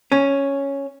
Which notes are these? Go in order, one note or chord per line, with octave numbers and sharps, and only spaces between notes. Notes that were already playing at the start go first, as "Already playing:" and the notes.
C#4